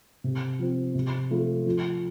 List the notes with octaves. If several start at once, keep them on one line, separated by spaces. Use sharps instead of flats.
C3
F3 C4
C3
F3 A3 F4
F3